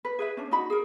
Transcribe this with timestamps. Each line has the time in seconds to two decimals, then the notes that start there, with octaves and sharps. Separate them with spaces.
0.05 B4
0.19 G#4 B4 E5
0.37 C#4 D4
0.51 D#4 F#4 D#5 B5
0.70 G#4 A#4